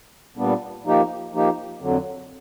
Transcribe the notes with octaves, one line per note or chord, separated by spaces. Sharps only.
A#2 G3 B3 D4
F3 A#3 D#4 G4
F3 A#3 D#4 G4
F2 D3 F#3